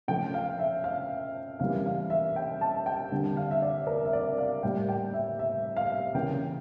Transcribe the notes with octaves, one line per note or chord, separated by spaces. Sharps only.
C#3 F3 A3 G5
F5
E5
F5
C#3 E3 G3 A#3 F5
F5
E5
G5
A5
G5
D3 G3 A#3
F5
E5
D5
A#4
E5
D5
F5
A2 G3 A#3 G5
G5
E5
E5
F5
C#3 E3 A#3 G5